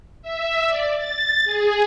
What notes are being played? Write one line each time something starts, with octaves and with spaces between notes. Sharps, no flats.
E5
D5
A6
G#4